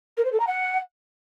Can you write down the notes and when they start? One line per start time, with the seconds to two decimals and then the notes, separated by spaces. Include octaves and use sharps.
0.17 A#4
0.25 C5
0.32 A4
0.40 A#5
0.47 F#5